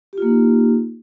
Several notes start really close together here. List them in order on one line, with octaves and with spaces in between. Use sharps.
G4 F4 A#3 D#4